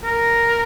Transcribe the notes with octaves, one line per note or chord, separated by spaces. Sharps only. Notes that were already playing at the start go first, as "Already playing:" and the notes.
A#4